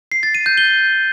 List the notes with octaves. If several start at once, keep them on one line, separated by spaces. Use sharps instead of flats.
C7
A6
D#7
G6
G7